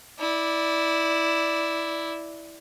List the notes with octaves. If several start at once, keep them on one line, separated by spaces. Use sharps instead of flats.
E4 D5